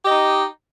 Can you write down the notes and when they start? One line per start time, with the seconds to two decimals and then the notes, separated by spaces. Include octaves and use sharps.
0.03 G4
0.06 D#5
0.10 D#4